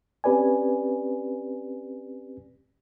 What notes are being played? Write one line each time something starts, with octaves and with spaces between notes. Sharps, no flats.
C4 C#4 G4 B4 D5 G#5